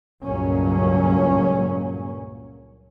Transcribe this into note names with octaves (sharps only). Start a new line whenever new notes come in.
C#2 G2 A#2 F#3 A#3 C#4